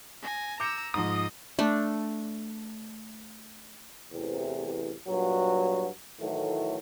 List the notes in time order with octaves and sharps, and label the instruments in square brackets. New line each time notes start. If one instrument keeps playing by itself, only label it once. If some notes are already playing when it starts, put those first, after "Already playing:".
[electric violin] G#5 A#6
[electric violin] A#5 E6 [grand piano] D6 G6 C#7
[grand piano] G#2 F3 [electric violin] D#5 [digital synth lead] D#6
[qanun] A3 D4
[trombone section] A1 E2 C3
G2 A#2 F#3
A2 D#3 E3 F#3 A3